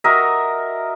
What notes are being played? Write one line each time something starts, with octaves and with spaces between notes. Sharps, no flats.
F#4 A#4 D#5 E5